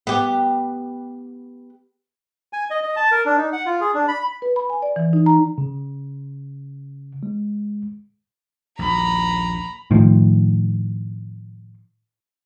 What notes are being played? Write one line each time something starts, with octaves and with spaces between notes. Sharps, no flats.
B3 G4
G#5
D#5
D#5
A5
A#4
D4
D#4
F#5
F4
G#4
D4
B5
B4
B5
G#5
D5
E3
D#4
A#5
C#3
G#3
A#1 D#2 A#5 B5
A2 D#3 F3